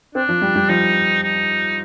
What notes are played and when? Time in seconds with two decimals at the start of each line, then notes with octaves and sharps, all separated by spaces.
0.15 C4 D4
0.29 F3
0.42 G3
0.56 G3
0.69 F3 D#4
1.23 D#4